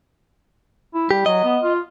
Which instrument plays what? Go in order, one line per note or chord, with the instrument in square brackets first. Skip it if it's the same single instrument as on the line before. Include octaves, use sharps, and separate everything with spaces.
[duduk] E4
[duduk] G3 [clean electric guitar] G4
[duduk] F#3 [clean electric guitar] D#5
[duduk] B3
F4